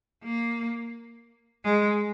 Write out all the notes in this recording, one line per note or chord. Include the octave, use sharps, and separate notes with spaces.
A#3
G#3